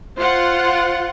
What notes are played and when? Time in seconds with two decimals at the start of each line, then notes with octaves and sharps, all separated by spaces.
0.18 F4 C5 F#5